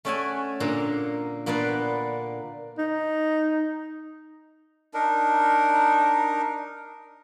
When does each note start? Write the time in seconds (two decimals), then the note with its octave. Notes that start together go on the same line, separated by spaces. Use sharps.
0.05 A3 C#4 D5 E5 F#5 G#5
0.60 A#2 D3 A#3 A#5
1.46 A#2 A#3 B3 D4 B4 D5
2.78 D#4
4.94 D4 D#4 A#4